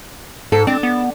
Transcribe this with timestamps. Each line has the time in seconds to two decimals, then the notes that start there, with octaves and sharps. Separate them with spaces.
0.52 G#2 A4
0.67 C4 D4
0.83 B3